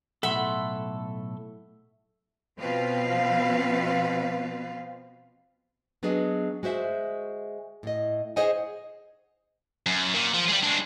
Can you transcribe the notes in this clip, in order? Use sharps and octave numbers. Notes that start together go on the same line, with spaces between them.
B1 A2 A4 E5 F#5 B5 C6
B2 F3 C4 F4 B4 F5
F#3 B3 D4 G#4 D#5
G#3 F#4 C5 E5
A2 D#5
G#4 C5 C#5 D#5 F#5 G#5
F#2
A#2
F3
G3 G#3
G#3 D4